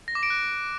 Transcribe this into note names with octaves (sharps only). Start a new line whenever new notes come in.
A#6
D6
D7
F#6